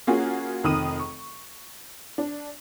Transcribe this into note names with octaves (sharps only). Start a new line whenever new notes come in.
A#3 C#4 F4 F#4 G#4
F1 D#3 D#6 D#7
C#6
D4